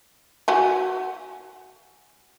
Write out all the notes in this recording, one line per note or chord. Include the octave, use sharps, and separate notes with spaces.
F#4 F#5 G#5